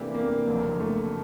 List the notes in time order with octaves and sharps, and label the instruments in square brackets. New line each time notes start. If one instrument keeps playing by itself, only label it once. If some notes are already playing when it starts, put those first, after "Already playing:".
Already playing: [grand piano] C3 E3 A3 D4 G4 [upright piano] A#3
[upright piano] A#3
[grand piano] F#1 F2 D3 F#3
[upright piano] A3